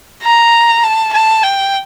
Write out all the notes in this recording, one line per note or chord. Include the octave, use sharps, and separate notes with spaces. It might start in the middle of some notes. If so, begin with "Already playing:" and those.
A#5
A5
A5
G5